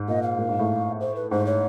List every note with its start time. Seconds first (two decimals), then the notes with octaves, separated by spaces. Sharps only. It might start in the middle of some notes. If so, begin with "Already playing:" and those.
Already playing: G#2
0.08 A#2 D#5
0.23 F5
0.38 A#2
0.49 G#2
0.59 A2
1.01 C5
1.16 B4
1.31 G#2 C5
1.47 C#5